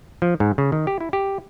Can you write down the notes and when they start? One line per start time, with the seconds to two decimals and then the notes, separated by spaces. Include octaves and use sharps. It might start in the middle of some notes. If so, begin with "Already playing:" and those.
0.22 F3
0.40 G#2
0.58 C#3
0.72 D#3
0.87 G4
1.00 E4
1.13 G4